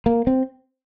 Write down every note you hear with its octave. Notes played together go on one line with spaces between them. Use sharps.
A#3
C4